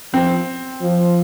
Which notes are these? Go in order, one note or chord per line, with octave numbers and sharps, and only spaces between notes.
F3 C4
F3